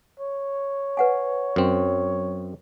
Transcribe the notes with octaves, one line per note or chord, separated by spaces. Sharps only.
C#5
B4 F#5 G#5
F#2 C4